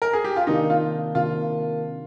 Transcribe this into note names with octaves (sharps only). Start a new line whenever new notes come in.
A#4
G#4
G4
F4
C3 D#3 A#3 D4 D#4
F4
C3 D#3 A#3 D4 F4